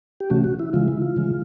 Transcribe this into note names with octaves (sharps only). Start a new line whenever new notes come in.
G4
C3 E3 A3 C#4 F#4
F#4
E4
C#3 E3 G#3 F4
E4
F4
C#3 E3 G#3